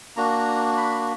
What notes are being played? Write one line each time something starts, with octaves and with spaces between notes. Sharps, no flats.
A#3 D4 F#4 A#5
B5